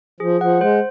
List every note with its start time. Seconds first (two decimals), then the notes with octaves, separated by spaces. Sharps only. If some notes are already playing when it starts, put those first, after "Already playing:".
0.20 F3 G#4
0.41 F3 F#5
0.61 G#3 C5